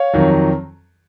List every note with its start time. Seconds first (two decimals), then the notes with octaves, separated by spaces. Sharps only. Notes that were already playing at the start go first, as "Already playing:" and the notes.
Already playing: C#5 F5
0.13 F2 D#3 F#3